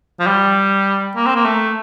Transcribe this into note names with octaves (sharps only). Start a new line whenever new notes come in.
F3
G3
A#3
C4
A#3
A3